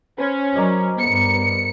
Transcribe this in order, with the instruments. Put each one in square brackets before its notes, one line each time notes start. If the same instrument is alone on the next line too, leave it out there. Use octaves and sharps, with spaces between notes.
[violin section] C#4 [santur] B4 C5
[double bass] F#3 [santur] A#4 D5 D#5
[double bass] G2 B3 [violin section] C#7